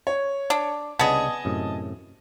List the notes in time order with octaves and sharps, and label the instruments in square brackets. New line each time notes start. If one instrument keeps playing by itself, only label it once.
[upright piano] C#5
[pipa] D4
[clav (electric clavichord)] C2 C#3 D4 [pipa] B3 G#4 [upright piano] D#5 A5
[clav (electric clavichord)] F#2 A2 C3